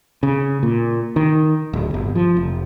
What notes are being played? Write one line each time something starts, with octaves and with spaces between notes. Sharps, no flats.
C#3
A#2
D#3
D1
G1
F3
F1